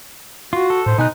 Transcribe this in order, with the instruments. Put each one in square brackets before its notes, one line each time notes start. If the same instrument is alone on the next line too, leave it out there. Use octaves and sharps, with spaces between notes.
[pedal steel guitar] F4 [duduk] F#4
[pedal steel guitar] A4
[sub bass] A2 [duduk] C5
[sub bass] B2 [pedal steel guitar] B3 G#5 F#6 [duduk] D#4